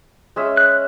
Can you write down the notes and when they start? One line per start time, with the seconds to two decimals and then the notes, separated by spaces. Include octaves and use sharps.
0.36 G#3 C#4 E5
0.57 F#6